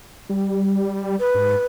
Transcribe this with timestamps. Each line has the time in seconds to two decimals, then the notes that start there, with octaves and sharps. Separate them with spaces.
0.29 G3
1.20 B4
1.35 G#2